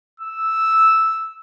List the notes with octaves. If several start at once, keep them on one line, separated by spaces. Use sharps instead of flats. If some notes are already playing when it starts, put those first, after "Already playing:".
E6